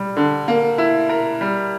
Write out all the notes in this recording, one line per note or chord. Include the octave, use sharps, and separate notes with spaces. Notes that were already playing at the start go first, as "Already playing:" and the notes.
Already playing: G3
D3
A#3
E4
A#4
G3